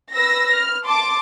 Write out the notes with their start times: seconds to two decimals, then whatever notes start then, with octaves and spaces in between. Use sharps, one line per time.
0.14 B4 E6 A#6
0.54 F6
0.86 A5 C6 D6